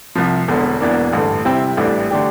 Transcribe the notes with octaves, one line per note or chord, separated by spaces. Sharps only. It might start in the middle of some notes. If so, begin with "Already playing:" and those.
C2 C3 F3
E1 E2 D3
E1 E2 E3 A#3 D4
A1 G2 D3
C3 G3 C4 E4
A1 A2 E3 G3 D4
D3 A3 D4 G4